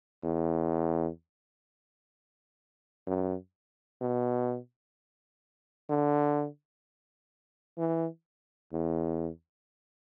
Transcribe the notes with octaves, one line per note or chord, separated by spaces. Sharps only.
E2
F#2
B2
D3
E3
E2